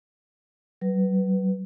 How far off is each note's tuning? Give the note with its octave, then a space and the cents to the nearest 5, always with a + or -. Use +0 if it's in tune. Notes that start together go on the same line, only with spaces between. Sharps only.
F#3 +40 B4 +0